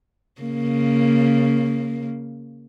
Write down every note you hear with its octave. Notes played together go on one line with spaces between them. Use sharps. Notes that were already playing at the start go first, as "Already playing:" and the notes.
C#3 A#3